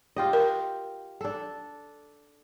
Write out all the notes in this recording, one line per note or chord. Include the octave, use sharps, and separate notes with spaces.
F4 G4 D#5
A#4
D4 A4